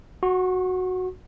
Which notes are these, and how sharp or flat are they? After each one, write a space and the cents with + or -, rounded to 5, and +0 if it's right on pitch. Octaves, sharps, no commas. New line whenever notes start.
F#4 -5 C#6 -40